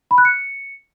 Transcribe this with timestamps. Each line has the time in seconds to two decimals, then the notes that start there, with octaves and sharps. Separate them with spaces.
0.11 B5
0.18 F#6
0.25 C#7